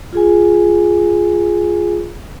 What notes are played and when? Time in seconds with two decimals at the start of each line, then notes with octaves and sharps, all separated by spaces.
0.13 F4 G#4 G#5